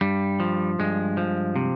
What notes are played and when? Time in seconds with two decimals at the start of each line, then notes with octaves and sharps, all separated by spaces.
0.01 G2 G3
0.40 F3
0.79 G2 G#3
1.17 F3
1.56 C3